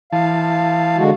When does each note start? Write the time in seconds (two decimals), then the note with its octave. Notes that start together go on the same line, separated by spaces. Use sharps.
0.12 E3 F5 A5
0.97 D3 G#3 F#4